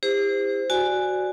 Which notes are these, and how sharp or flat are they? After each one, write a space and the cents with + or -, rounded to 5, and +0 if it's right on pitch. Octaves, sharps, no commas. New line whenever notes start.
E4 +0 G4 +40 C5 -15
F#4 +0 D5 +0 G#5 +0